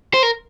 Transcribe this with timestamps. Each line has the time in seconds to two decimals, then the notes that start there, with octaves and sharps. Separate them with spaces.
0.14 C5
0.23 A#4